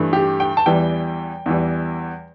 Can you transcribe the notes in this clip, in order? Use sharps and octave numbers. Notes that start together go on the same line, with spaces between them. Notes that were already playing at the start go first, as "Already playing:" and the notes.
Already playing: G2 E3 A3
G4
G5
A5
E2 E3 G3 G5
E2 E3 G3